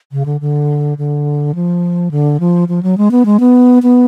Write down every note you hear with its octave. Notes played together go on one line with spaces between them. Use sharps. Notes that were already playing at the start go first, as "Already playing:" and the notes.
C#3
D3
D3
D3
F3
D3
F3
F3
F#3
G#3
B3
G#3
B3
B3